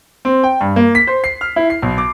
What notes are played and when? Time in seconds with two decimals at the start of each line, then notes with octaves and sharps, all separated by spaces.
0.25 C4
0.43 G5
0.61 G2
0.76 A#3
0.95 B6
1.07 C5
1.24 C7
1.41 F6
1.56 E4
1.70 C7
1.82 B1
1.98 D6